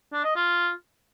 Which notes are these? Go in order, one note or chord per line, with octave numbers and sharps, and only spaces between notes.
D4
D#5
F4